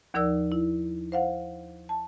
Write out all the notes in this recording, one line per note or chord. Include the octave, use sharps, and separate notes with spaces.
D#2 F3 D#4 A#4 D5 E6
E4
C5 F5 F#5
A5